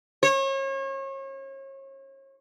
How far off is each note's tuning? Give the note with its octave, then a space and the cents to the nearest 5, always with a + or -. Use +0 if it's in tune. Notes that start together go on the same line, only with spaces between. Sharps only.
C#5 -35